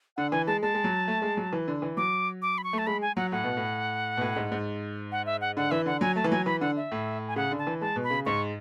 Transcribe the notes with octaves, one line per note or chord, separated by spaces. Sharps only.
D3 F#5
E3 G#5
G#3 A5
G#3 A5
G#3
F#3
A3
G#3
F#3
E3
D3
E3
F#3 D6
D6
B5
C#6
A3
A5
G#3 B5
G#5
F#3 F#5
A2 F#5
B2
A2
B2
A2
G#2
G#2
F#5
E5
F#5
D3 F#5
E3 E5
D3 F#5
F#3 G#5
A3 A5
E3
F#3 G#5
E3 B5
D3 F#5
E5
A2
G#5
C#3 F#5
D3
A5
E3
G#3 A5
B2
B5
C#3
G#2 C#6